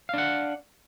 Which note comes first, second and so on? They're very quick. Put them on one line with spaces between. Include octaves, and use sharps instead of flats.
F5 D4 F#5